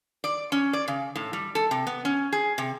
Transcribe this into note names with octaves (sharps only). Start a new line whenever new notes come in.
D5
C#4
D5
C#3
A2
G3
A4
C3
B3
C#4
G#4
C3